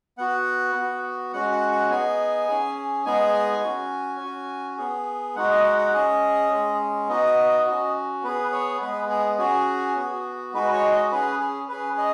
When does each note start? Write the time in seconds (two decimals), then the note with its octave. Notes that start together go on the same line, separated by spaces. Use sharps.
0.18 B3 F#4 F#5
0.75 B3 F#4
1.33 G#3 C#4 F#4 F#5
1.52 F#5
1.71 F#5
1.90 B3 D#4 G#4 G#5
2.48 C#4 G#4
3.06 G#3 B3 D#4 G#4 G#5
3.63 C#4 F#4
4.20 C#4 F#4
4.78 B3 G#4
5.36 G#3 D#4 F#4 F#5
5.50 D#5
5.64 F#5
5.78 F#5
5.94 C#4 G#4 D#5
6.51 G#3 C#4 G#4
7.08 B3 D#4 F#4 D#5
7.66 C#4 F#4
8.23 B3 G#4 B4
8.52 C#5
8.81 G#3 B3 G#4 B4
9.09 G#4
9.38 C#4 F#4 G#4
9.96 B3 F#4
10.54 G#3 D#4 F#4 B4
10.73 C#5
10.92 D#5
11.11 C#4 G#4 B4
11.40 G#4
11.69 C#4 G#4 B4
11.98 D#5